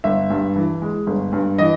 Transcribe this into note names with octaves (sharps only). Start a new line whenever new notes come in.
G1 E5
G2
E3
G#3
G1
G2
E3 D#5